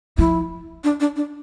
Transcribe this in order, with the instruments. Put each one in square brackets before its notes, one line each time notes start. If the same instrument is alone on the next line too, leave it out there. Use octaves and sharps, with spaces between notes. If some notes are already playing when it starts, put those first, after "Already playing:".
[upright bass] F3 [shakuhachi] E4
[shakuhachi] D4
D4
D4